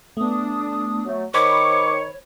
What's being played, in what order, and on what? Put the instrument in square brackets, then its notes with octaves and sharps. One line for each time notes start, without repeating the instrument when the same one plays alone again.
[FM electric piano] A3 B3 [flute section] D4 D#6
[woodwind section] F#3 A3
[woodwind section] D#3 C#6 [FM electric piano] C5 B5 G#6 [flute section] C#5 [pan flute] D6